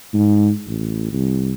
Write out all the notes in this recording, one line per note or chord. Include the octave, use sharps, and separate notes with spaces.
G#2
A1
C2